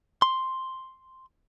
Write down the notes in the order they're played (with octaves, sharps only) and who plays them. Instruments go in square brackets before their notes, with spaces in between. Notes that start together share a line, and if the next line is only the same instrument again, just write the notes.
[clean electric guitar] C6